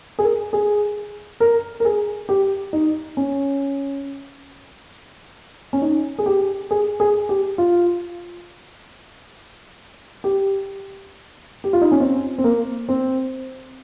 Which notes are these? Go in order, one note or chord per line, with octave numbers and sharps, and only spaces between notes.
G#4
A#4
G#4
A#4
A#4
G#4
G4
D#4
C#4
C#4
D#4
G#4
G4
G#4
G#4
G4
F4
G4
G4
F4
D#4
C#4
C4
C4
A#3
C4